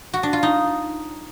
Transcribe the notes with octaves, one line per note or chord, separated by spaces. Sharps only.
F#4
D4
F4
D#4